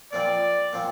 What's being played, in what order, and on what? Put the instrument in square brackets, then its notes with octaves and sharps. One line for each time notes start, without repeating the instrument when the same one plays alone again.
[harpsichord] A#2 F3 C4 [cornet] D5
[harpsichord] A#2 F3 C4